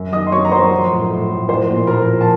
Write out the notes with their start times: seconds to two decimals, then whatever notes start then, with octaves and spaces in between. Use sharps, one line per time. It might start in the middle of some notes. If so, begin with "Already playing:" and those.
Already playing: F#2
0.12 D#3 D#5 D#6
0.27 C6
0.32 F#3 C#5 C#6
0.45 A#5
0.51 F#3 C5 C6
0.71 F3
0.90 A2
1.10 A2
1.29 A2
1.49 F3 C5 C6
1.69 A#2
1.87 F3 A#4 A#5
2.08 F3
2.21 A5